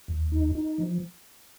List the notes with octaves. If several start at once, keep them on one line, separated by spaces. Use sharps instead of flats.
D#2
D#4
D#4
F3